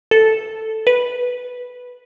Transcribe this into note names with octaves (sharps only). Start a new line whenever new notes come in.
A4
B4